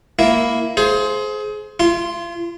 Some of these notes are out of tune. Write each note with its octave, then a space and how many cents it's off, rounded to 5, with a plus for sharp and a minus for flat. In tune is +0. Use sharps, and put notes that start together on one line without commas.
A#3 +0 E4 +0
G#4 +30 C5 +0
F4 -40 C6 +0